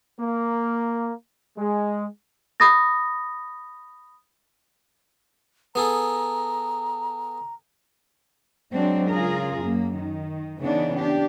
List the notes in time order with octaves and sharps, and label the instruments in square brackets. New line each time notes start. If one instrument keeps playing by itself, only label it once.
[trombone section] A#3
G#3
[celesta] B5 D#6 A6 A#6
[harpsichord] B3 G#4 A4 [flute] A#5
[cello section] F#3 G#3 C4 D4
C#3 F4 G#4 A#4
F#2 A#3
D#3
C#3 E3 B3 D4 D#4
D4 G4